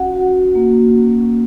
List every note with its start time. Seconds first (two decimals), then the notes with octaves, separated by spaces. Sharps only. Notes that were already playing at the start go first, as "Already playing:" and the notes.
Already playing: C#4 F#4 F#5
0.14 F#4
0.55 A#3
0.96 C#4